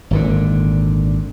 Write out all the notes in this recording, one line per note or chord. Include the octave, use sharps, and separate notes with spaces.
G#1 A#2 D3